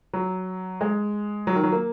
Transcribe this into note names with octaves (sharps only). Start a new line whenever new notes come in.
F#3
G#3
F#3
D#3
F#3
A#3